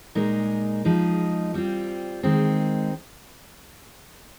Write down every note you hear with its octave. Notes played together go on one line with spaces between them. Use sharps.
A#2 G#3 D#4 A#4
F3 G#3 D#4
G3 C4 F4
D#3 G#3 C4